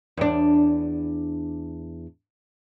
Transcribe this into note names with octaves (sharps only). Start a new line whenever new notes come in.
E2 D4